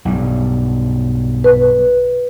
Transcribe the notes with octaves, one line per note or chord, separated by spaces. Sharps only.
B1 G2
B4